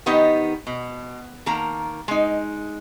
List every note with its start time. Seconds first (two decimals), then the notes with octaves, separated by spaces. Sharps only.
0.06 D#3 B3 D#4 G4 D#5
0.67 B2
1.46 D#3 A#3 A5 A#5
2.08 G#3 D#4